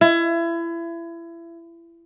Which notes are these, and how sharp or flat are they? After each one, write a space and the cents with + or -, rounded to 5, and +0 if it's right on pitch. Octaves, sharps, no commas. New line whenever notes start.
E4 +30